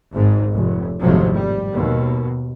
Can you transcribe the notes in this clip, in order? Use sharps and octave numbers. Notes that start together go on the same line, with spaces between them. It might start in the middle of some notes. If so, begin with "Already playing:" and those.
G#1 G#2
F1
G#1 F2 A2 C3 F3 F#3
G3
D#2 B2